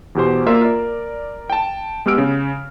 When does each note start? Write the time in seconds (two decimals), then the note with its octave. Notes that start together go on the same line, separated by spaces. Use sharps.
0.15 E2 B2 G4 C5
0.46 A#3 F4 A#4 D5 E5
0.62 A#4 D5
1.50 G5 A5
2.06 G#3 B3 G4 E6 F6 D7
2.18 C#3